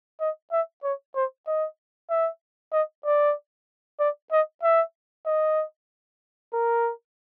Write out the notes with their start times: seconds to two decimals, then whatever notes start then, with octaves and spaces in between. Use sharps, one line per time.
0.20 D#5
0.52 E5
0.83 C#5
1.15 C5
1.47 D#5
2.10 E5
2.73 D#5
3.05 D5
4.00 D5
4.32 D#5
4.63 E5
5.26 D#5
6.53 A#4